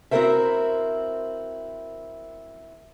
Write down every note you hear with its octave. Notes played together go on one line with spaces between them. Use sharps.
C4 E4 F#4 A#4 C5 E5